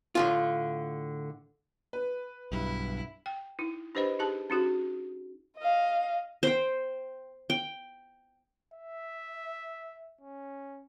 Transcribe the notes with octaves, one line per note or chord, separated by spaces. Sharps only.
A2 D3 F4
B4
B1 G2 E4
G5
D#4 E4
D4 G4 B4 C5 D#5 B5
D#4 G4 G#4 A5
C#4 D#4 F#4 G#4
D#5 F5
C5 G5
G5
E5
C#4